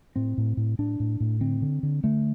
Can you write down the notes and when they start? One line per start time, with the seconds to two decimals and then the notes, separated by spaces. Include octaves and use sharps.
0.16 A2 C4
0.38 A2
0.57 A2
0.79 A2 D4
1.00 A2
1.20 A2
1.41 D3 C4
1.62 D3
1.83 D3
2.04 D3 A3